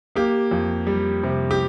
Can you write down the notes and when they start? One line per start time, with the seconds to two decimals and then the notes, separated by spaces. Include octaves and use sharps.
0.15 A#3 G4
0.51 F2
0.87 G3
1.23 C3
1.51 G4